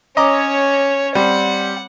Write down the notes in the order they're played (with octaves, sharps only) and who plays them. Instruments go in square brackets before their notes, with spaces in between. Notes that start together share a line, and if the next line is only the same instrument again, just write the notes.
[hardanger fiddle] C#4 C#5 [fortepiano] D#5 A#5 D6
[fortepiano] G3 C4 [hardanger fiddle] F#5